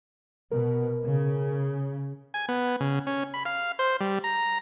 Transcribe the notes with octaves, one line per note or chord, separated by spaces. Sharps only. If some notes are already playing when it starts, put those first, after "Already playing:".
B2 A#4
C#3
G#5
B3
C#3
C#4
B5
F5
C5
G3
A#5